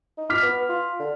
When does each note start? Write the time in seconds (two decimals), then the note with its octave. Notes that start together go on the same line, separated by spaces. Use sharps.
0.18 D#4
0.29 D6 F6 B6
0.43 B3
0.69 F4
0.99 D3